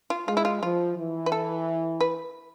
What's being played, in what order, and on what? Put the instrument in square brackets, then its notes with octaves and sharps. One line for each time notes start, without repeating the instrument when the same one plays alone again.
[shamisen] F4
[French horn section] G#3 [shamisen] F4
[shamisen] E4
F4
[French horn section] F3 [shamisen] F4
[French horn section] E3
[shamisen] B4
A4
B4